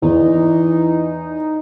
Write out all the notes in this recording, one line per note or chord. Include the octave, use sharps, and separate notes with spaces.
E2 E3 D#4